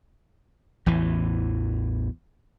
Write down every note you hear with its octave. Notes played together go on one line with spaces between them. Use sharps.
A1 E2 E3